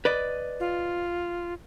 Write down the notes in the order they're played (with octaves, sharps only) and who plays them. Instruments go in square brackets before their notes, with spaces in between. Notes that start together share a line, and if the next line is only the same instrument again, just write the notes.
[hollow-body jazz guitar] B4 D5 D#5
[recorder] F4